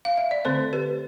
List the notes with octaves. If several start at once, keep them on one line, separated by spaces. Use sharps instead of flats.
F5
E5
D5
D3 A3 C4 A4 C5
G4 B4